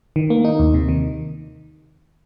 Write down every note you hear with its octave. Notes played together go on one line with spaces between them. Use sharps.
D#3
A#3
D#4
D#2
C3
D#3